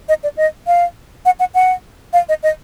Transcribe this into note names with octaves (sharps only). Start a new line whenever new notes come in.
D#5
D5
D#5
F5
F#5
F#5
F#5
F5
D#5
D#5